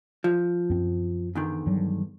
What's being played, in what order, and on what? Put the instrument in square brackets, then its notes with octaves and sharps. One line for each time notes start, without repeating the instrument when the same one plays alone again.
[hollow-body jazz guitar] F3
[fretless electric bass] F#2 C4
[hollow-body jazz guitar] E2 D3 D#3
[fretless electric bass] G2 F#3